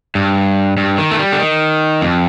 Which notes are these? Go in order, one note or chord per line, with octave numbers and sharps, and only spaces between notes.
G2
G2
D#3
A3
G3
D3
D#3
F2